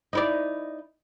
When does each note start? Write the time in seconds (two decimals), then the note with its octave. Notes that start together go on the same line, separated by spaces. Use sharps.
0.13 D#4 E4 D5